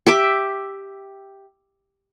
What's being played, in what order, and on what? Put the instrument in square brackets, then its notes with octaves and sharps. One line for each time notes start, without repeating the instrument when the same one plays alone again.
[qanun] G4 E5 D6